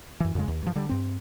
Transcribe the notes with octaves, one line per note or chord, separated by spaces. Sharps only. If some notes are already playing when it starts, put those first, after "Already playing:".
F#2 E3
F2 C#3 G#3
D#2
G2 F3
D3 G3
G2 C4